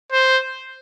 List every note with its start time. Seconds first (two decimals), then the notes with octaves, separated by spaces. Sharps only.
0.12 C5